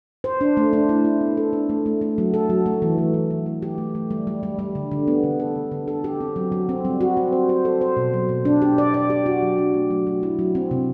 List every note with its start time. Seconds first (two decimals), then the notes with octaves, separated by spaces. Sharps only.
0.24 C5
0.41 D4
0.57 A3
0.73 D4
0.89 E4
1.05 E4
1.21 B3
1.37 A4
1.53 D4
1.69 A3
1.86 A3
2.01 A3
2.18 F#3
2.34 A4
2.50 F#3
2.66 A3
2.82 E3
2.98 E3
3.14 E3
3.30 E3
3.46 A3
3.62 G4
3.78 A3
3.95 A3
4.11 G3
4.27 G3
4.43 G3
4.59 G3
4.75 D3
4.92 D3
5.08 B3
5.23 D3
5.40 A4
5.56 D3
5.72 D3
5.88 A4
6.04 G4
6.21 C4
6.36 F#3
6.52 F#3
6.69 C4
6.85 G3
7.01 F#4
7.17 C4
7.33 C5
7.49 C5
7.65 A4
7.81 C5
7.97 B2
8.14 F#3
8.29 B2
8.45 D4
8.62 G4
8.78 D5
8.94 D5
9.10 G4
9.26 F#4
9.43 F#3
9.58 D4
9.74 A3
9.90 F#3
10.07 F#3
10.23 E4
10.39 F#3
10.55 C4
10.71 C3